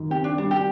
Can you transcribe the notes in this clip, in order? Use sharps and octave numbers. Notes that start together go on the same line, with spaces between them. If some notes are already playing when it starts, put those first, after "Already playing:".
Already playing: F#2 D#3
C4 G4
D4
G3 D4
G4